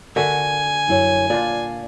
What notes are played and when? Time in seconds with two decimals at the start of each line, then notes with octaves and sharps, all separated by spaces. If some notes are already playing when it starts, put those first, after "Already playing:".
0.16 D3 F#4 A#4 E5 F#5 G#5
0.88 F#2 E4 C#5
1.30 A#2 D4 F4 D5